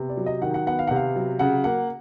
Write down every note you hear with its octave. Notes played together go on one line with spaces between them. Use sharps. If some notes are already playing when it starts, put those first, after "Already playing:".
Already playing: C3 B3
D5
F#3
D#5
D#3 F#5
F#5
B3 F#5
F5
C3 F#5
F5
F#3
C#3 F#5
A#3 F#5